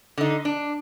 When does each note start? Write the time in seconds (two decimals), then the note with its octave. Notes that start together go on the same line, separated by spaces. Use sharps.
0.18 D3 D#4
0.45 D4